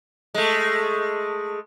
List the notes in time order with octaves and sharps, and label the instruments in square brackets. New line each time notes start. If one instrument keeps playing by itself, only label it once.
[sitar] G#3 A3